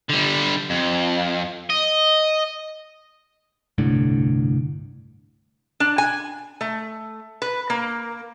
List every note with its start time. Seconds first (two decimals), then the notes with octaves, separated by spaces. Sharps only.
0.09 D3 G3
0.70 F2
1.70 D#5
3.78 G1 C2 A2 D3
5.80 D4
5.98 G#5
6.61 A3
7.42 B4
7.70 A#3